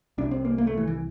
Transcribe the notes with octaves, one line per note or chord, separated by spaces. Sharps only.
C2 C3 D4
C4
A#3
A#3
A3
E3
E3